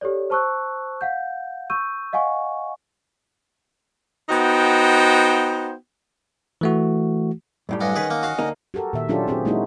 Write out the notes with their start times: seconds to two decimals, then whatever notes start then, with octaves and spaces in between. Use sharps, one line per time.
0.01 G4 A4 C#5 D5
0.30 C5 A5 C#6 E6 F#6
1.01 F5 F#5 G6
1.70 C#6 E6 G6 D#7
2.13 D#5 F5 F#5 G#5 C#6
4.29 B3 D#4 F#4 C5 G5
6.61 E3 A3 F#4
7.69 F#2 A2 G3
7.81 G2 C#4 D4 D#5 F#5
7.96 D#3 G#4 B4
8.10 A#3
8.23 F#4 F5
8.38 D2 A#3 D#4
8.74 F#4 G4 A4 A#4
8.93 A#2 D#3 E5
9.08 F#3 C#4 D4 F4 G4 A4
9.27 C4 G4 G#4
9.45 G#3 A#3 C#4 D#4 E4 F#4